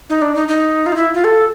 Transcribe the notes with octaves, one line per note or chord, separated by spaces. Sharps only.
D#4
D4
D#4
D#4
F4
D#4
E4
F4
A4